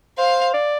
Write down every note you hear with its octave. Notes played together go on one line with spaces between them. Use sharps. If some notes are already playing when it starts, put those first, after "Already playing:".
C5 F5
D5